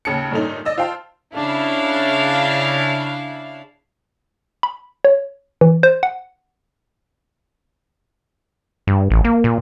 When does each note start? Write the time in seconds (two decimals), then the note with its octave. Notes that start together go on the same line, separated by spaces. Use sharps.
0.05 D#2 C#3 A5 C#7
0.32 G2 A#2 A3 C#4 D#4
0.65 D5 D#5 E6
0.78 F4 C5 F5 G5 A5 C6
1.34 C#3 D4 E4 F5
4.63 B5
5.04 C#5
5.61 E3
5.83 C5
6.03 F#5
8.87 G2
9.10 A1
9.24 A#3
9.44 A#2